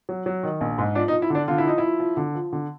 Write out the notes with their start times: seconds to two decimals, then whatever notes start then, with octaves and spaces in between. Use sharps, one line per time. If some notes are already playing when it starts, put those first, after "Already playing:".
0.09 F#3
0.26 F#3
0.43 D#3
0.61 A#1
0.78 G#2
0.95 F3 D4
1.08 D#4
1.13 F3
1.22 E4
1.30 D3 D4
1.48 D3 F4
1.58 E4
1.65 F3 D#4
1.78 F3 E4
2.00 F3
2.17 D3
2.35 F3
2.53 D3